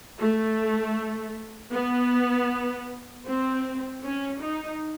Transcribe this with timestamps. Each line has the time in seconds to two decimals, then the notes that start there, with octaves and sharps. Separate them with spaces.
0.19 A3
1.72 B3
3.26 C4
4.03 C#4
4.42 D#4